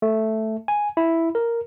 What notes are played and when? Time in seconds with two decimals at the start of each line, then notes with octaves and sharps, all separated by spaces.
0.02 A3
0.68 G#5
0.97 E4
1.35 A#4